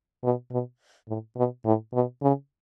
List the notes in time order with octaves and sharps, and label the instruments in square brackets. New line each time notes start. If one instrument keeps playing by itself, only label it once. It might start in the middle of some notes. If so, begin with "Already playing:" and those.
[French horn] B2
B2
A2
B2
A2
B2
C#3